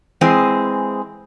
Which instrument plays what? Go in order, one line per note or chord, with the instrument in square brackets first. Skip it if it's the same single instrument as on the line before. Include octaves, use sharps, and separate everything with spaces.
[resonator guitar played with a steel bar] E3 G#3 C4 G#4